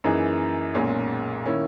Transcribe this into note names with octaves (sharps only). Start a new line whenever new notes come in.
F#2 E3 A#3 D#4 G#4
B1 A#2 G#3 C#4 G#4
D#3 A#3 C#4 E4